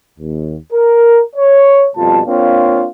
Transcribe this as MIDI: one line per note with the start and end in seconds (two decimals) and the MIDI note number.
0.19 0.56 39
0.73 1.21 70
1.36 1.87 73
1.96 2.21 41
1.96 2.21 47
1.96 2.21 55
1.96 2.21 65
1.96 2.21 81
2.26 2.86 58
2.26 2.86 60
2.26 2.86 62
2.26 2.86 65
2.26 2.86 73
2.26 2.86 77